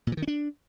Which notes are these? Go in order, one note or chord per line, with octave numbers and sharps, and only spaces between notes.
A#2
E3
D#3
C#4
D4